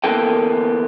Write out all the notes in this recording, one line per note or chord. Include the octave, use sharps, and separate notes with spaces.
D2 E3 A#3 B3 A4 G5